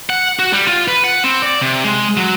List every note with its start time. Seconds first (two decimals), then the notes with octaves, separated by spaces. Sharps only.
0.10 F#5
0.39 F#4
0.53 G3
0.68 F4
0.88 B4
1.04 F#5
1.24 C4
1.42 D5
1.62 C3
1.84 G#3
2.17 F#3